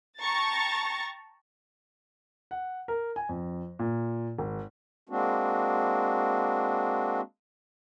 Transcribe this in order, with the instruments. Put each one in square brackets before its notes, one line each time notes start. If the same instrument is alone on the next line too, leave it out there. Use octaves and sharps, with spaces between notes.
[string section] G5 A5 A#5 C#6 A6
[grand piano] F#5
A#4
G#5
F2
A#2
G#1
[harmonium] G#3 A#3 C4 D4 F#4